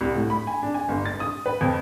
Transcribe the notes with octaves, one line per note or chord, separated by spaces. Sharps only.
C2
A2
B5
G#5
D4
G#5
G1
A6
D#6
B4
F2